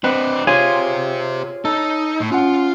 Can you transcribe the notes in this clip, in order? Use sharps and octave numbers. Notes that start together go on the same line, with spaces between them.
C4 D4 B4 D#5 F#5
F4 G4 G#4 C5 C#5 G#5
D#4 A4
A2
C#4 F4 F#5